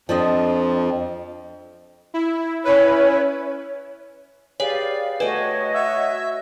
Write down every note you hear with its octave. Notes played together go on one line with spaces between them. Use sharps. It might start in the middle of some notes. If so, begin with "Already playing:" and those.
F2 F3 D4 D#5
E4
C#4 E4 B4 C#5
G4 G#4 B4 C#5 D5 F5
A3 F#4 B4 C#5 D#5 G5 G#5
E5